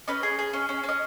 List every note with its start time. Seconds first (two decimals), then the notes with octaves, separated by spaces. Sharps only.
0.08 C#4 B4 D#5
0.23 G#4
0.39 G#4
0.53 C#4
0.69 C#4
0.84 C#4 D#5